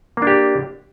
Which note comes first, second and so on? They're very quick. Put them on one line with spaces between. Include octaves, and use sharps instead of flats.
A#3 D4 G4